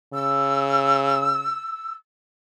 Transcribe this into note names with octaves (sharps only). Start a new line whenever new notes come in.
C#3 E6